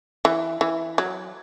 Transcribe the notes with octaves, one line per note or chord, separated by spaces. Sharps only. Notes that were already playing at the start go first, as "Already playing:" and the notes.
E3
E3
F#3